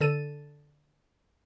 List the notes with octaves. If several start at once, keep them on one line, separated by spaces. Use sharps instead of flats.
D3 A4 D#7